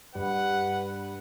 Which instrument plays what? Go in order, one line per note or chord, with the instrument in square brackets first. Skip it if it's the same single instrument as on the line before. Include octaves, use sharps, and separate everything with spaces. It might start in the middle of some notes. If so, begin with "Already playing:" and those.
[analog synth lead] G2 [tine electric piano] G3 [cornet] B4 [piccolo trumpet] F#5